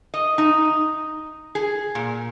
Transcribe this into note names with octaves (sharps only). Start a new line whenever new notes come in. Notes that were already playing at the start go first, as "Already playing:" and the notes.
D#5
D#4
G#4
A#2